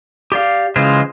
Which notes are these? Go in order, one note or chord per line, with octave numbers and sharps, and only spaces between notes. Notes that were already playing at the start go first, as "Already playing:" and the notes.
G4 D5 F5
C#3 E3 G#3 F4 C5